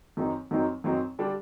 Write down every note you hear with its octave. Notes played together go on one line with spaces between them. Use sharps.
F#2 D#3 F#3 C4 D#4
F#2 D#3 F#3 C4 D#4
F#2 D#3 F#3 C4 D#4
D3 G3 D4